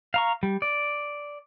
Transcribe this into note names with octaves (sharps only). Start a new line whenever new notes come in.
F5 A#5 C#6
G3
D5